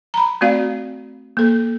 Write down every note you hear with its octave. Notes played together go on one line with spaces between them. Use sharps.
A#5 B5
A3 C4 F#4 D5 F5
A#3 A4